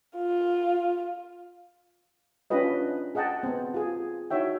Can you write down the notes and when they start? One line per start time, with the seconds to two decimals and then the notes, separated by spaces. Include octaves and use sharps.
0.17 F4
2.50 C#4 D4 F4 G4 B4 D#5
3.15 G#4 D#5 F#5 G5 A5
3.43 B3 C4
3.74 F4 G4 G#4
4.30 D#4 E4 F#4 C#5 E5 G5